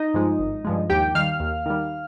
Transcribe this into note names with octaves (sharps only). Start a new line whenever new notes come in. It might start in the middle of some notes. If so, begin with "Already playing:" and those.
Already playing: D#4 D#5
G2 F3 G#3
G#1
G2 F3 G#3
D#2 G4 G5
D#3 G3 F5 F6
D#2
D#3 G3